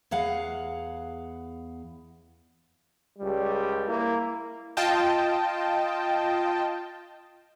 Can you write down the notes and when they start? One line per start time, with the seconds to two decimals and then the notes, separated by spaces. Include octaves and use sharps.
0.11 E2 G#4 F5 F#5
3.19 C#2 G3
3.88 A#3 E4
4.77 F4 D#5 G5 A5